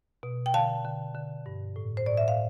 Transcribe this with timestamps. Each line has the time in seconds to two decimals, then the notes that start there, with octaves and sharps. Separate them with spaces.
0.23 B2
0.46 G5
0.54 D3 F5 A5
0.84 D3
1.14 D3
1.46 G2
1.76 A2
1.97 C5
2.06 A2 D5
2.17 E5
2.28 F5